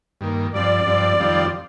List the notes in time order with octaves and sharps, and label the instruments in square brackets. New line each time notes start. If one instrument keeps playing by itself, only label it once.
[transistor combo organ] G2 D#3 A#3
[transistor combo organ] G2 F3 C4 [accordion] D5
[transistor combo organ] G2 F3 C4
F2 D#3 G3 C4 F4